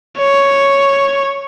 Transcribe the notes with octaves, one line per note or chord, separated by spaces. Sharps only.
C#5